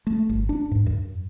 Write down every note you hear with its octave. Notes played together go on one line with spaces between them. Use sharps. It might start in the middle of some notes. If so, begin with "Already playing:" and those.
A3
G1
D4
G#2
F#2